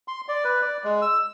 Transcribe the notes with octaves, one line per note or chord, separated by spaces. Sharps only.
C6
D5
B4
D5
G#3
E6